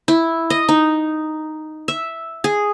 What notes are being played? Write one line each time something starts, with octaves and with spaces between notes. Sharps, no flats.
E4
D#5
D#4
E5
G#4